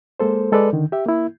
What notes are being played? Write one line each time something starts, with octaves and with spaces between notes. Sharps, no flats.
G#3 A#3 A4 C5
G#3 A4 B4 D5
D3 D#3
G4 E5
A#3 E4